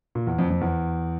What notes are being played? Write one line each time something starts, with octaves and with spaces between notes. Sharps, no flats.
A#2
E2
F2
F2
E2